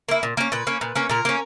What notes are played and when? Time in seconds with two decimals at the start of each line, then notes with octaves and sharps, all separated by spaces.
0.09 A#3 E4
0.23 A#2
0.37 A#3 C#4
0.52 A#2 B4
0.67 A#3 C#4
0.81 A#2
0.96 A#3 C#4
1.10 A#2 A#4
1.25 A#3 C#4